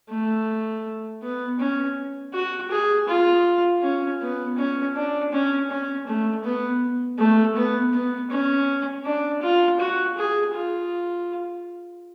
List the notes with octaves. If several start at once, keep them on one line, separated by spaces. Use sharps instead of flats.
A3
B3
C#4
F#4
G#4
F4
C#4
B3
C#4
D4
C#4
C#4
A3
B3
A3
B3
B3
C#4
D4
F4
F#4
G#4
F4